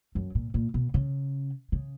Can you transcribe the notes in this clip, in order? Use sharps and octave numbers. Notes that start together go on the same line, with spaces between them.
F#2
A#2
A#2
B2
C#3
C#3